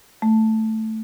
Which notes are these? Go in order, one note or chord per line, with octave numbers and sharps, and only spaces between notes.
A3